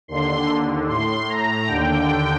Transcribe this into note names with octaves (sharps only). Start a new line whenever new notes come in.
D#2 D3 C6
A2 C6
A#5
D#2 D3 G5